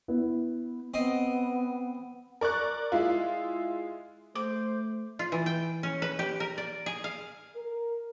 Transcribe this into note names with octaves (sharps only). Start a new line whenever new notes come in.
B3 E4
B3 C4 D#5
A#4 D5 C#6 F#6
G#3 E4 F4
A3 C5 D6
F4
E3
G5
C#4
B4
G4
A#4
D5
G#4
F5
A#4